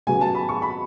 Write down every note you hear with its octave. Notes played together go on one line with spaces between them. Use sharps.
C#3 F#3 B3 G#5
A5
B5
C#6
B5